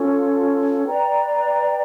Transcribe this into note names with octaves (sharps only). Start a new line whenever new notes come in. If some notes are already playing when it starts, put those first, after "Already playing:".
Already playing: C#4 F4 A4
B4 D5 G5 A#5